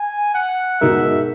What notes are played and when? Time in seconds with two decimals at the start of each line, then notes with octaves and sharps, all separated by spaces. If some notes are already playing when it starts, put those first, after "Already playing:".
Already playing: G#5
0.35 F#5
0.81 B2 G#3 D#4 A#4 E5